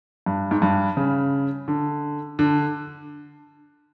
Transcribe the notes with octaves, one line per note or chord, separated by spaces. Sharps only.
G2
G#2
G2
C#3
D3
D3